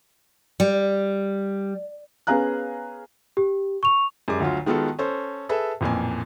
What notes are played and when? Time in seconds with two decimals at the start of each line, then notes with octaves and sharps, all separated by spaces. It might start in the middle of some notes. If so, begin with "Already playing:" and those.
0.60 G3
2.27 B3 C#4 G#4 F5 A#5 F#6
3.37 G4
3.83 C#6 F7
4.28 F#2 G3 G#3 D6
4.40 D2 F#3 F4
4.66 D#3 G#3 B3 F4 F#4 A4
4.99 C#4 A4 C5
5.49 G#4 A4 B4 E5
5.81 A1 F2 A#2 G#5